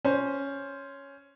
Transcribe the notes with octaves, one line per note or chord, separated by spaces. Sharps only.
C#4 C5